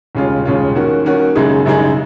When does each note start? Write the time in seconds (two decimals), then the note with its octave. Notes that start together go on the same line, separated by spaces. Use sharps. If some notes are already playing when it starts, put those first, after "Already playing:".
0.15 D#2 C#3 G#3 C#4 F4
0.45 D#2 C#3 G#3 C#4 F4
0.75 D#3 A#3 C#4 F#4
1.05 D#3 A#3 C#4 F#4
1.35 F#2 C#3 G#3 D#4 G#4
1.66 F#2 C#3 G#3 D#4 G#4